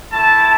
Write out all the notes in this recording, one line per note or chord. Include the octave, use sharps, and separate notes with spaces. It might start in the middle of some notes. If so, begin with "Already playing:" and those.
A3 E4 A5